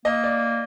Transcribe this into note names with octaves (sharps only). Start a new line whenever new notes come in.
A#3 D#5
D5